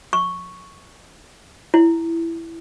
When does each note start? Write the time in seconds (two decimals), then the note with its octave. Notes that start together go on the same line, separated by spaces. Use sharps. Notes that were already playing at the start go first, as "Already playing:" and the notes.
0.13 C#6
1.74 E4